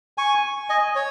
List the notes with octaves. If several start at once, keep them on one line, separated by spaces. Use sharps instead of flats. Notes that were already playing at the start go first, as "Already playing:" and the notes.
G#5 C#6
D#5 G#5
C#5